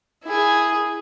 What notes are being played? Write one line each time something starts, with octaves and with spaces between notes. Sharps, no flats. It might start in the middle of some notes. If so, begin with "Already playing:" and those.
E4 G#4